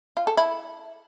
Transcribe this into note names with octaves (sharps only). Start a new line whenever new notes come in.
F4
A4
E4